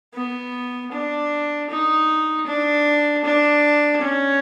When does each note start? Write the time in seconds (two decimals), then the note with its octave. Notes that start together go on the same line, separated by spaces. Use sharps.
0.14 B3
0.92 D4
1.69 D#4
2.46 D4
3.24 D4
4.01 C#4